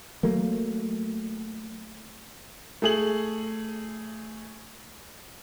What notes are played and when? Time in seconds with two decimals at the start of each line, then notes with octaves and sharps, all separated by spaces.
0.23 F#3 A3 A#3
2.82 A3 G#4 F#7